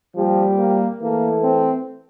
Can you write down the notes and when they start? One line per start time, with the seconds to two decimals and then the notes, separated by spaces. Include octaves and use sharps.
0.15 A#2 F3 G3 C4 G4
0.58 A#3
1.01 E3 A3 A#3 E4 A4
1.44 C4